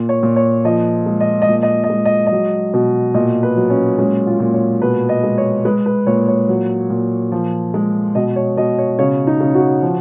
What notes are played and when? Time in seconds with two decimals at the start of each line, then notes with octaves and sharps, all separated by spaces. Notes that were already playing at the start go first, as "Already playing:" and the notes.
Already playing: A#2
0.09 C#5
0.23 A#2
0.36 C#5
0.65 F3 D#5
1.06 G#3
1.21 D#5
1.42 D#5
1.49 A#2
1.63 D#5
1.84 D#5
1.90 G#3
2.05 D#5
2.27 F#3 D#5
2.74 B2
3.14 A#2 D#5
3.43 B4
3.57 F#3
3.70 C#4
3.99 G#3 C#4
4.27 F4
4.40 A#2
4.54 C#5
4.82 B2 B4
5.09 D#5
5.23 G#3
5.38 C#5
5.65 G#3 B4
5.86 B4
6.07 A#2 C#5
6.28 C#5
6.49 F#3
6.90 A#2
7.32 F3
7.74 G#3
8.15 B2 D#5
8.36 C#5
8.57 B2 D#5
8.79 C#5
8.99 C#3 C#5
9.27 D#4
9.40 C#3
9.55 F#4
9.82 F3